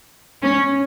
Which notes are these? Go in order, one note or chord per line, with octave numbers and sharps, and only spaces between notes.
C#4